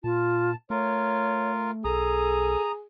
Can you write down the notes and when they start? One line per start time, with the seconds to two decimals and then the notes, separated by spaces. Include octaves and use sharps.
0.04 A#2 F4 A5
0.70 A3 F4 A#4 C#5
1.84 B1 G#4 A4 A#5 D#6